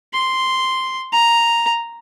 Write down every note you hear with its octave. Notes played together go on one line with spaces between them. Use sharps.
C6
A#5